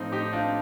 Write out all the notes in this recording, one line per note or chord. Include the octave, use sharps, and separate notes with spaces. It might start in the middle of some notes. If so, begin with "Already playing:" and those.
Already playing: A2 F3 C4 D#4
D#4 G4
D4 F4